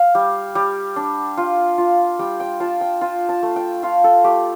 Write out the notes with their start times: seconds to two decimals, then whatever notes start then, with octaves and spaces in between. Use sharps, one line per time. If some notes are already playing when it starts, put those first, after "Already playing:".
Already playing: F5
0.15 G3
0.55 G3
0.96 D4
1.37 F4
1.78 F4
2.19 G3 G5
2.40 G5
2.60 F4 A5
2.81 G5
3.01 F4 A5
3.29 A5
3.43 A3
3.56 G5
3.83 F4 F5
4.04 A4
4.24 A3 G4